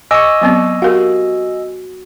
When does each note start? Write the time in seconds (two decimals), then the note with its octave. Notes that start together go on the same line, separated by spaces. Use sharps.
0.11 D#5 G#5 C#6 D6 E6
0.41 F#3 B3 C4
0.82 F#4 G4 A#4 F5